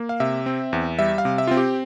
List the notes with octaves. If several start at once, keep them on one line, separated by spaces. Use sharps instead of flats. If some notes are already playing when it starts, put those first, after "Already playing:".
Already playing: A#3
F5
C3 E5
C4
E2
G3 E5
F5
C3
E5
C4 F4
G4